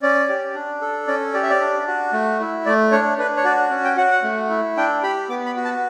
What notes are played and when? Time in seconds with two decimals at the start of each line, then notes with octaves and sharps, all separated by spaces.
0.02 C#4 D5
0.29 G4
0.55 D4
0.82 A4
1.07 C#4 D5
1.34 G4 D5
1.43 E5
1.50 D5
1.61 D4
1.87 F#4
2.13 A3
2.40 E4
2.66 A3 D5
2.92 D4 C#5
3.18 D4 B4
3.37 C#5
3.44 F#4 D5
3.71 C#4
3.84 G5
3.97 F#4 F#5
4.11 F#5
4.23 A3
4.50 E4
4.77 D4 G5
5.03 G4 B5
5.29 B3 D6
5.46 B5
5.56 F#4
5.64 A5